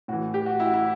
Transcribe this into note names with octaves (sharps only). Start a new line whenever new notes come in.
A2 E3 F#4
G4
F#4
E4
F#4
E4